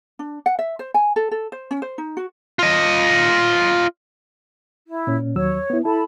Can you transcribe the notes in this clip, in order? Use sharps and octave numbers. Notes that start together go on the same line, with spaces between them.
D4
F#5
E5
C5
G#5
A4
A4
C5
C#4
C5
D#4
F#4
F4 D#5
E4
A#2 C#4
D#2 F#3 C#5 E6
B3 E4
E4 A4 A5 B5